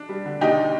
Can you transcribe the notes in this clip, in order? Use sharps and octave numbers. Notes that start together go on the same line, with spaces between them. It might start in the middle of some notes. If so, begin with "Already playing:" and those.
Already playing: D4
G3
D3
D#2 D#4 G4